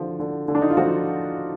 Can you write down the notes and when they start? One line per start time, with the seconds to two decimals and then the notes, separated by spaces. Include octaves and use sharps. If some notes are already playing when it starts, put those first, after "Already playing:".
Already playing: D3 F3 F#4
0.20 D3
0.48 D3
0.55 D4
0.62 D#4
0.70 F4
0.77 F3 F#4